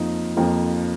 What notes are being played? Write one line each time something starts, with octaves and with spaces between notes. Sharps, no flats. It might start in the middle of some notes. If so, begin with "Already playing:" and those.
Already playing: F2 F3 A#3 D#4
F2 F3 A#3